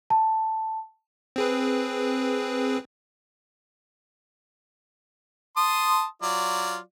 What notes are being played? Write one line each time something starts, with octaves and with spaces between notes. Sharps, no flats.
A5
C4 G#4 B4
A5 C6 D#6
F#3 F4 D5